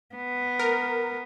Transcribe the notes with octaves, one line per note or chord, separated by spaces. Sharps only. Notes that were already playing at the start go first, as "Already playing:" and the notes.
B3
A#4